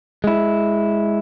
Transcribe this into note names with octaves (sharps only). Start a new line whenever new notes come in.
G#3 E4